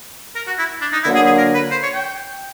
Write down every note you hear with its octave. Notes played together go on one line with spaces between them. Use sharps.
A#4
F#4
E4
D4
D#4
D3 F#3 A#3 E4
G#4
G#4
A#4
B4
C5
C#5
G5